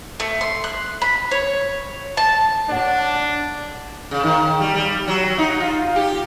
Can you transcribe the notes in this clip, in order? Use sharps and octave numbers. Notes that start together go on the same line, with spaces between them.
A3
C6
F#6
B5
C#5
A5
D4 C#5 F#5
C#3
D#3
G3
G3
F#3
D#4
F4
G4